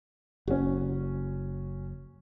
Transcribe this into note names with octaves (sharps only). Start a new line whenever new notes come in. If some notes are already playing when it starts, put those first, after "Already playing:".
F#1 C#4 F#4